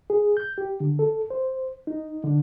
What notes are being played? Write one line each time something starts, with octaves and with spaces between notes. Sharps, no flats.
G#4
G6
G4
D3
A4
C5
D#4
D3